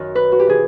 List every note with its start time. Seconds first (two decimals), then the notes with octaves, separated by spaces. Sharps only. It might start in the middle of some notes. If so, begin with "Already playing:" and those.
Already playing: F#2 D#3
0.15 B4
0.32 F#4
0.39 G4
0.47 C3 E3 G#4